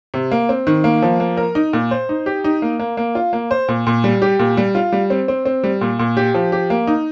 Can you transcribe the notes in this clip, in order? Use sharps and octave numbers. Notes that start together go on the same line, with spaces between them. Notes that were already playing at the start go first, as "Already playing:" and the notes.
C3
A#3
C4
D#3
A#3
F3
A#3
A#4
D#4
A#2
C5
D#4
G4
D#4
A#3
A#3
A#3
F4
A#3
C5
A#2
A#2
G3
G4
A#2
G3
F4
G3
C4
C4
C4
G3
A#2
A#2
G4
F3
G4
A#3
D#4